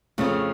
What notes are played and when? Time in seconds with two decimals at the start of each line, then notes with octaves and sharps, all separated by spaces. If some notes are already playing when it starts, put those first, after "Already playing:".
0.18 F2 C#3 F3 A3